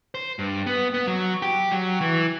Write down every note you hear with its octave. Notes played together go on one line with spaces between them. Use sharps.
C5
G2
B3
B3
F#3
G4
F#3
E3